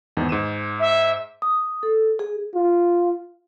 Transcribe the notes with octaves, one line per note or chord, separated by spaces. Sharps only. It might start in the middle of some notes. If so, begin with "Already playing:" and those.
E2 G#2 D#3
G#2 D#7 E7
E5
D#6
A4
G#4
F4